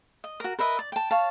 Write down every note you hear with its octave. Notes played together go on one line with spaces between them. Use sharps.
D#5
F#4 A#4
A#4 B4 D#5 E5
D5
G5 A5
C#5 F5 A5